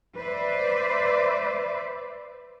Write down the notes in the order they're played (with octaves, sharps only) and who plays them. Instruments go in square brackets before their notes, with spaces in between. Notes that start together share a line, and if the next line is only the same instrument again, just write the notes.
[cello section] B4 C5 D5 E5